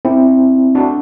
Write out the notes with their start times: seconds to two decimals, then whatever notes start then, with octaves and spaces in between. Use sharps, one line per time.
0.05 C4 E4
0.75 D4 F#4